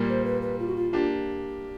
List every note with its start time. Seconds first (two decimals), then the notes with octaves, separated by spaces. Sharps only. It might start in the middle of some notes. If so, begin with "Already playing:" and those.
Already playing: A#2 G3 A#3
0.09 C5
0.25 B4
0.42 B4
0.59 F4
0.68 F#4
0.76 F4
0.92 A#3 D4 F4 G4